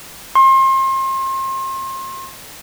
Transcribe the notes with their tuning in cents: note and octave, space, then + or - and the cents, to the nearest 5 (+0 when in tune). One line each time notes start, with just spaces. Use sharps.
C6 +35